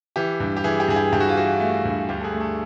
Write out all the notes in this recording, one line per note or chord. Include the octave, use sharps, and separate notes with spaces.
E3 G4
G2
G4
E3 G#4
G4
G2 G#4
G4
G2 G4
F#4
F4
E3 F#4
A3
G2
D2 G4
A4
G#4
A3
A4